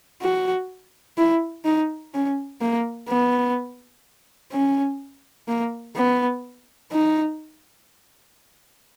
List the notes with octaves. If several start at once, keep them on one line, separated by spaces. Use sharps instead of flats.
F#4
E4
D#4
C#4
A#3
B3
C#4
A#3
B3
D#4